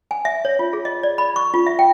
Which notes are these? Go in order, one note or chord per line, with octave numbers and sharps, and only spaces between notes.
G#5
E5
C#5
F4
G#4
D#5
D5
B5
C#6
F4
E5
G5